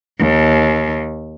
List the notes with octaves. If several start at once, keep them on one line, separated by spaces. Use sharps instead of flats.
D#2